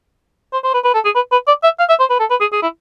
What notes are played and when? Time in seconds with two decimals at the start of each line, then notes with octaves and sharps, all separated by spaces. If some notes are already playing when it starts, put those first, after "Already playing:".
0.53 C5
0.64 C5
0.74 B4
0.84 B4
0.94 A4
1.05 G#4
1.15 B4
1.32 B4
1.48 D5
1.64 E5
1.79 F5
1.89 E5
2.00 C5
2.10 B4
2.20 A4
2.31 B4
2.41 G#4
2.53 G#4
2.63 E4